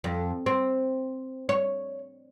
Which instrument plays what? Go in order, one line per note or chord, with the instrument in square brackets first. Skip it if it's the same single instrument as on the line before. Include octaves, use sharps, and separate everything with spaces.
[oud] F2
C4
C#5